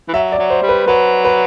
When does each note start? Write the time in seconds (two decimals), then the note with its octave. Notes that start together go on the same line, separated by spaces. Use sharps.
0.09 E3
0.14 F#3 E5
0.32 D5
0.39 F#3
0.50 C5
0.63 G3
0.69 B4
0.87 F#3 B4
1.25 B4